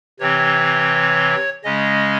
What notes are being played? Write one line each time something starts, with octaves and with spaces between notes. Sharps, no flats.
C3 E3 C4 C#5
C#3 G#3 C#4 D#5